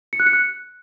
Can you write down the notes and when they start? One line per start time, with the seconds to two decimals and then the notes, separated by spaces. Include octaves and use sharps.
0.13 C#7
0.20 F#6
0.26 C#7
0.33 F#6